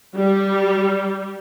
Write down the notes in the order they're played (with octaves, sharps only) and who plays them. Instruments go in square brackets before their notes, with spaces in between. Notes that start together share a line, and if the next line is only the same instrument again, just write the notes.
[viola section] G3